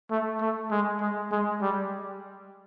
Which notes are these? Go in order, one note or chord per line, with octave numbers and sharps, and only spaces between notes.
A3
A3
G#3
G#3
G#3
G3